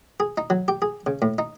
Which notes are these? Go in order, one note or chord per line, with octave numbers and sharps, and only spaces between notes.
G#4
D#4
F#3
G4
G#4
C#3
A2
D#4